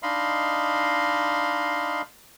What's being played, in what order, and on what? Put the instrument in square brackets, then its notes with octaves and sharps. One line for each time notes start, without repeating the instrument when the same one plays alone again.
[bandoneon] D4 D#4 D#5 F5 B5 C6